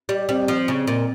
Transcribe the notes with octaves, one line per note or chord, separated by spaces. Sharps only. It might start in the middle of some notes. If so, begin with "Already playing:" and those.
G3
G3 C4 C5
F3
C#3
A#2